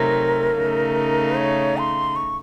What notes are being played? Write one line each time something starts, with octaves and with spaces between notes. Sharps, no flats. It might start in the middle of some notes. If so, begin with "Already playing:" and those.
Already playing: C3 F#3 A3 D#4 A#4
C#3 A3 D#4
C#5
C6
C#6